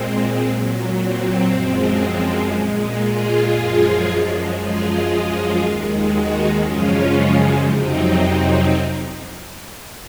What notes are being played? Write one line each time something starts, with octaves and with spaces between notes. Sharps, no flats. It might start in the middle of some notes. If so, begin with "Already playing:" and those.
Already playing: A#2 G#3 C4
A#2 F#3
C4
F#2 F3 G#3
A#2 G#3
F4 G#4
F#2 F3 G#3
F#2 F3 G#3 F4 G#4
D#2 D#3 G#3
D#4 F#4
F#2 C#3 F3 G#3 C#4 F4
F2 C3 F#3 C4 D#4